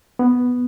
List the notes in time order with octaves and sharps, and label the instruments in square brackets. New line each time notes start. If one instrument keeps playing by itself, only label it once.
[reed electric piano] B3